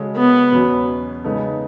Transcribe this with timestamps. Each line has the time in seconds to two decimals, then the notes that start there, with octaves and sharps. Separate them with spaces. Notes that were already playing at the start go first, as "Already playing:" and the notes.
Already playing: C#3 G#3 C#4 F#4 A4
0.16 B3
0.52 E2 B2 F#3 C#4
1.24 C#3 G#3 B3 D#4 A4